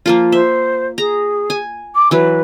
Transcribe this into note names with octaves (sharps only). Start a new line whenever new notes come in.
F3 A#3 F4
C5 E5
G#4 A#5
G#5
D6
E3 F#3 B4